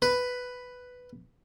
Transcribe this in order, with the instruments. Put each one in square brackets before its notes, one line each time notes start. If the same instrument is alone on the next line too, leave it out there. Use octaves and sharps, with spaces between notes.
[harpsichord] B4